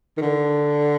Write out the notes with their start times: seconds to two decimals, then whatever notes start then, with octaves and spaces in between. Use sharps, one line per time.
0.17 D#3
0.21 D3